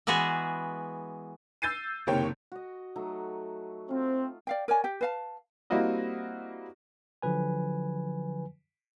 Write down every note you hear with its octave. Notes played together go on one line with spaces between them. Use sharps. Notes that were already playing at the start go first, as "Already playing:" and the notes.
E3 G#3 B3 F#4 G#4
E6 G6 A6 C7 D#7
F#1 C3 D#3 A#3 C#5 G5
F#4 D#5
F#3 A3 D#4
C4 F4
D5 F5 G5
A#4 C#5 D5 G#5
G4 G5
B4 F5 A5
G3 A#3 C4 E4 F#4 D#5
D3 F3 F#3 B4 G#5